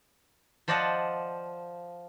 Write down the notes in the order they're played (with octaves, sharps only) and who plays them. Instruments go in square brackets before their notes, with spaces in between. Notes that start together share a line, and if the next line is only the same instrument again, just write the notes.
[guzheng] F3 C5 D5 D#5 F#5 A5